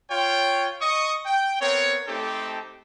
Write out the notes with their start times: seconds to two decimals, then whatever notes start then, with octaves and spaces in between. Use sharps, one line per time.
0.11 F4 C#5 G5
0.82 D#5 C#6 D#6
1.26 G5
1.61 B3 C4 A#4 C#5
2.08 A3 C4 D#4 G4 A4 A5